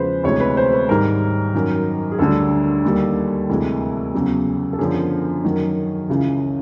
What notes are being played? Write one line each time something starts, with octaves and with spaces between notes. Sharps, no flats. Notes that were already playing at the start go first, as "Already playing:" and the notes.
Already playing: E2 C#3 F3 G#3 B4 C5
D2 C3 E3 G#3 C#5
B4
C5
B4
G#2 D#3 G3 A#4
F#2 D#3 F#3
G#4
D2 D3 G3 A4
D#2 D#3 G3
D2 C3 E3 G#3
E2 C#3 F#3
A4
F#2 D3 F3 G#4
F#2 D#3 F#3
C#2 C#3 E3